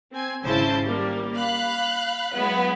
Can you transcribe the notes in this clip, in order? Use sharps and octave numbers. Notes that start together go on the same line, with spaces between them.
C4 G#5
G#1 C#3 E4 C5 A5 G6
G3 A#3
F5 B5 F#6
F#3 G#3 B3 E4